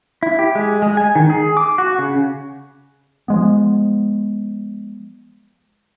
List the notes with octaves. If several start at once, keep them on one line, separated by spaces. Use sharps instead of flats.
E4
G4
G#3
G#3
G#5
D#3
G#4
D6
F#4
C#3
F3 G#3 B3